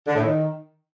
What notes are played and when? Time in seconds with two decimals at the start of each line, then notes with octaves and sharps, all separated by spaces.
0.07 D3
0.15 A2
0.24 D#3